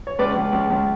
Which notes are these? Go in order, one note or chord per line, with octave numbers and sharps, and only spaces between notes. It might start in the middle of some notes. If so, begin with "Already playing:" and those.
C#5
C#2 B4 D5
C#2
C#2
C#2